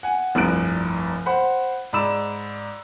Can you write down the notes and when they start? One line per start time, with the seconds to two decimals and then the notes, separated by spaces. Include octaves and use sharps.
0.03 F#5 G#5
0.35 F1 C2 G2 F#6 D7
1.26 C5 F#5 B5
1.93 G#2 D5 B5 D6 E6 E7